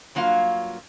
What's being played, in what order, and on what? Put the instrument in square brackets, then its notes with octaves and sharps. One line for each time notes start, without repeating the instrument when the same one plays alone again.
[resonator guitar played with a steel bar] G2 F#3 A#3 F4 F5